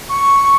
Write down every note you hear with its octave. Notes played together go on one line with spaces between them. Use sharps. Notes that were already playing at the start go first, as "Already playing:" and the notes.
C#6